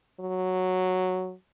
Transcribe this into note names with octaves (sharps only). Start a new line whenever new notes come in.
F#3